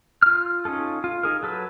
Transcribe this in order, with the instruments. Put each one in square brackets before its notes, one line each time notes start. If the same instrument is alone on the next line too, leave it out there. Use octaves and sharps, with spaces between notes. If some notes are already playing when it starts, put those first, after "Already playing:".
[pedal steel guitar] F4 F6
C#4 D#4 F4 A4
F4
D#4 G#4 A#4
F#3 A4 B4